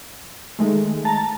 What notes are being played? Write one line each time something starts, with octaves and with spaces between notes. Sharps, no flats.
D#3 G#3 A3
A5 A#5 A6